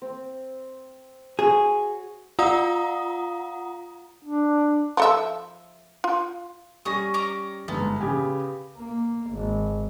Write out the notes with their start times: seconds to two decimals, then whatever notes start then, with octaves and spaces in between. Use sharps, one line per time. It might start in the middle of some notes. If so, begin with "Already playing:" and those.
0.02 C4
1.39 F#4 G#4 C#5 C#6
2.39 F4 F5 F#5 A#5 D#6
4.25 D4
4.97 F3 A4 E5
6.04 F4
6.85 G3 C#4 G#5 D#6 A#6
7.14 C#4 A#5 D6
7.68 G1 G#2 B3
8.01 C#3 G4 G#5
8.76 A#3
9.31 G#1